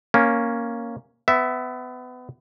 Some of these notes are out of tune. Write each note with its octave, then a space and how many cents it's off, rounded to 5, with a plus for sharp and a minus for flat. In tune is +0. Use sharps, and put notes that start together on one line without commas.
A#3 +0 C#4 +0
B3 +25 E5 +0